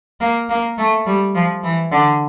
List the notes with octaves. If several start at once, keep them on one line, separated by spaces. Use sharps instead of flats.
A#3
A#3
A3
G3
F3
E3
D3